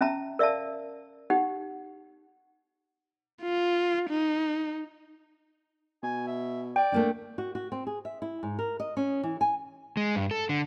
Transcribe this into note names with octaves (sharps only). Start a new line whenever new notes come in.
C#4 E5 A5 A#5
A#4 D5 E5 F5 A5
D#4 G4 F#5
F4
D#4
B2 G#5
E5
D5 G5
D1 A3 A#3 D4
F#4
F#4
C4
G#4
E5
E4
G#2
A#4
D#5
C#4
E3
G#5
G#3
G2
A4
D3